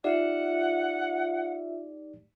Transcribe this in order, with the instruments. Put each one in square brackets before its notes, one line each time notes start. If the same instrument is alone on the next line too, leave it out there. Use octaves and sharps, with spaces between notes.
[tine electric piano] D#4 G4 D5 [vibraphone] F4 E5 [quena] F#5